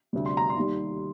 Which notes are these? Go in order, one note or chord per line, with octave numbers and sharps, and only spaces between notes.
D2 C3 G3
C6
A#5
C6
D#2 D#3 G3